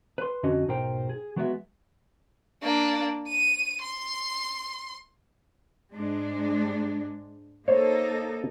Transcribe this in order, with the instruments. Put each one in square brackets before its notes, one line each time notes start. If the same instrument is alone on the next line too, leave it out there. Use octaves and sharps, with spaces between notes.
[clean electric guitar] B4 C6
F2 D3 C#4 F#4 D#5
B1 G#2 D#4 A#4 C5 G5
G#4
F#3 G#3 B3 F#4 C#5 E5
[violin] A#3 D4
D#7
C6
[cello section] G#2 G#3 D4
[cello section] A#3 D#4 A4 [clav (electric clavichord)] C5 C#5